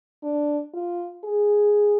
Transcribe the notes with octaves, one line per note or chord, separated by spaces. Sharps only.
D4
F4
G#4